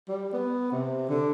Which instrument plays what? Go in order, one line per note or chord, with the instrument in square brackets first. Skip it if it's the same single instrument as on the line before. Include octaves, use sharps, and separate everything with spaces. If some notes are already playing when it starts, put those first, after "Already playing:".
[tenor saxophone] G3
B3
C3
D3